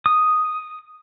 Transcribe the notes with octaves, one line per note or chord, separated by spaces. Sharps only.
D#6